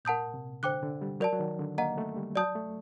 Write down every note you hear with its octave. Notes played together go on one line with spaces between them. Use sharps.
A#2 A#4 F#5 A5 D#6 G6
C3
D3 C5 G5 D6 F#6
D3
G3
F#3 A#4 D5 A5
F#3
D#3
D3
A#3 D#5 F#5 A#5
A3
G3
F#3 D5 A5 D#6 G6
A3